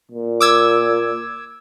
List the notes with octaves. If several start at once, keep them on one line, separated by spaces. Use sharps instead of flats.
A#2
D6 E6 G#6